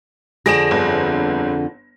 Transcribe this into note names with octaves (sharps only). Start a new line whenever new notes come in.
F2 D3 G#4 A#6 D7 E7
G1